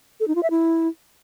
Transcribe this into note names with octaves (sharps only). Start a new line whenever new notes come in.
A4
D#4
F4
E5
E4